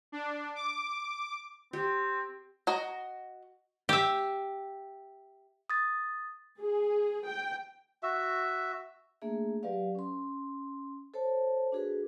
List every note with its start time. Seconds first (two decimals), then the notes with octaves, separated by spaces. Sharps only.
0.12 D4
0.55 D6
1.73 C4 G4
2.67 F#4 D#5 A#5
3.89 G4 E5
5.70 D#6 A6
6.60 G#4
7.28 G5
8.03 F#4 E5
9.22 A3 A#3 D4 G#4 E5
9.63 F#3 G4 B4 D5 F5
9.95 C#4 C6
11.14 A4 C5 C#5 A5
11.72 D4 F#4 G#4 A4 B4